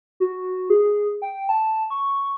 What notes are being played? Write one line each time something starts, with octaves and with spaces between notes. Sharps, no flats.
F#4
G#4
G5
A5
C#6